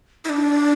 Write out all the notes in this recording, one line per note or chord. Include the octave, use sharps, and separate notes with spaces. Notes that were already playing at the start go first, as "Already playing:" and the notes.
E4
D4